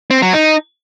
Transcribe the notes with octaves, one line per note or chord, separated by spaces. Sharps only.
C4
F#3
D#4